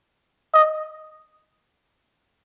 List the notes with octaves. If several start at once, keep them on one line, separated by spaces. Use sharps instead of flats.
D#5